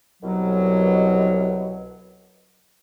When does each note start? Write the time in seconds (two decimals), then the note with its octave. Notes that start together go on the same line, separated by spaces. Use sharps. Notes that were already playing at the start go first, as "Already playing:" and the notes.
0.22 C2 B2 F#3